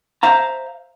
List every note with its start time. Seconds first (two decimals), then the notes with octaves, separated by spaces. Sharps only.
0.23 C5 E5 F5 A#5